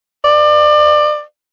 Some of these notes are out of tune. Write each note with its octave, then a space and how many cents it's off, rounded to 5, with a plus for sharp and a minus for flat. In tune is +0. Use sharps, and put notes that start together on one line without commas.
D5 +30